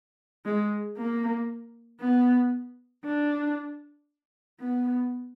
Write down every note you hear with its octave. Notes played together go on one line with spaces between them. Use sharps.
G#3
A#3
B3
D4
B3